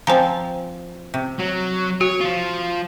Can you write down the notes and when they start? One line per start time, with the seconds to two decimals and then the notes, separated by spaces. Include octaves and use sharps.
0.07 F3 C4 C5 G#5 A#5
1.14 C3
1.39 F#3
2.01 F#4 C#5
2.20 F3 F4